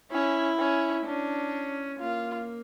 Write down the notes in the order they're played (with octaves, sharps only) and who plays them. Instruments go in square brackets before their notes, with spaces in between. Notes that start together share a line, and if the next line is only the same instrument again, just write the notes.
[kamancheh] C#4 [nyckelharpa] E4
[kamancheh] C#4
[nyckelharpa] C#4 [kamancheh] D4
[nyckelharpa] A#3 [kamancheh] F4